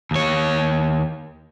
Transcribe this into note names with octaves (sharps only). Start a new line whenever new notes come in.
D#2 C#5